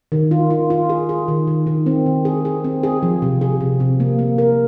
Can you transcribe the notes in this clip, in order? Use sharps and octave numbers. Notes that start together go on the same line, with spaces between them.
D#3
F4
F4
F4
G#4
G#4
D#3
D#3
D#3
C4
D#3
G#4
G#4
C4
G#4
F3
C3
G#4
C3
C3
A#3
A#3
A#4